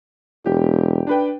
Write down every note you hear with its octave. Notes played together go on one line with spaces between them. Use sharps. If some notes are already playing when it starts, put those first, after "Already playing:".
E1 G4
D4 B4 G5